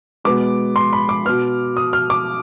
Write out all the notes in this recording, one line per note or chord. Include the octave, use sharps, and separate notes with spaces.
B2 G#3 B3 D6
C6
B5
D6
B2 B3 F6
D#6
F6
D6